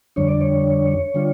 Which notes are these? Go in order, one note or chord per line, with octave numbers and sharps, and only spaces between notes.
F2 D3 G3 D4 C#5
D5
C#5
D3 G3 D4 F4